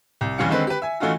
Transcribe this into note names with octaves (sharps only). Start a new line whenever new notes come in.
C2
F1 E3 G3 C#4 F5 C#7
D3 D#3 G#3 C4 B4
G4 B4
E5 G#5
E3 A3 C#4 D#4 F4 F#4